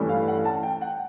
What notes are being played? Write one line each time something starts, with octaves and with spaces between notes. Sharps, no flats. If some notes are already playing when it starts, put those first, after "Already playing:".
Already playing: G2 E3 A3 C#4
F5
F#5
A5
G5
F#5